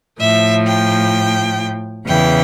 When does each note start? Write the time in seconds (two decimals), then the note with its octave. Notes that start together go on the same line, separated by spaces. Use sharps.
0.19 A2 F3 E5
0.65 G5
2.06 E2 C#3 E3 G5